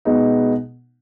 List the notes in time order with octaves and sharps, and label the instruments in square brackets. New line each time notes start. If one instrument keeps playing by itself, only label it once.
[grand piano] B2 G#3 B3 D#4